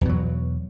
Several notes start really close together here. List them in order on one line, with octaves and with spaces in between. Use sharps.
E2 B2 F#3